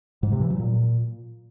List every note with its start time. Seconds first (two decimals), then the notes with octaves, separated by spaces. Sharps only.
0.23 G#2
0.32 C3
0.41 E3
0.50 F#3
0.59 A#2